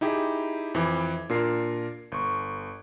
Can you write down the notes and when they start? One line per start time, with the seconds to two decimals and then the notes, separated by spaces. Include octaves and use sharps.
0.01 D#4 E4 G4 G#4
0.74 F2 E3 E5 D6 G#6
1.29 A#2 D4 F4 A#4 C7
2.12 G1 C#6